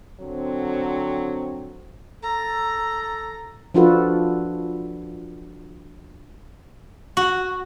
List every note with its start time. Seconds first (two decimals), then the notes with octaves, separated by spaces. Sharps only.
0.21 D3 F#3 C4
2.23 A4 A#5
3.74 F3 D4 F4 F#4 A4 B4
7.17 F#4